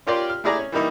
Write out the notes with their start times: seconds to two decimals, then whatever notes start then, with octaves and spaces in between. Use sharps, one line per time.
0.07 C#4 F4 G4 A#4 D5 C6
0.30 F6
0.44 A3 E4 G#4 D5 A#5
0.58 C#4
0.72 E3 G3 A#3 D#4 E4